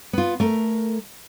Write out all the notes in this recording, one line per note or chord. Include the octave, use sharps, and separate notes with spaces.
B3 F4
A3 A#4